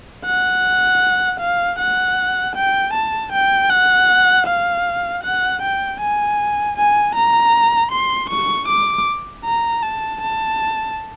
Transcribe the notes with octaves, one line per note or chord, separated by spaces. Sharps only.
F#5
F5
F#5
G5
A5
G5
F#5
F5
F#5
G5
G#5
G#5
A#5
C6
C#6
D6
A#5
A5
A5